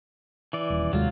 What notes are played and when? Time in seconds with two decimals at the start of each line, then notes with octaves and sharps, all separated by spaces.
0.53 E3 D5
0.70 D#1
0.93 D#2 C3 F#3 G#3 F4